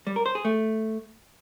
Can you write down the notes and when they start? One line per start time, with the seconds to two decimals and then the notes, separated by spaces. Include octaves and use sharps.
0.07 G3
0.16 A#4
0.26 C5
0.35 G#4
0.45 A3